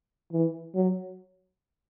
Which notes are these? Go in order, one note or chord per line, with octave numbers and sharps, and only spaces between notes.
E3
F#3